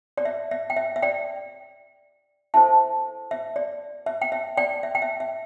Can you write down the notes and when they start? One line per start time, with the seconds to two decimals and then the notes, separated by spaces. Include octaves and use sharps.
0.18 D5
0.25 E5
0.51 E5
0.70 G5
0.76 E5
0.96 E5
1.02 D5 G5
2.54 E4 A4 C5 E5 A5
3.31 E5
3.56 D5
4.06 E5
4.22 G5
4.32 E5
4.57 D5 G5
4.83 E5
4.95 G5
5.02 E5
5.20 E5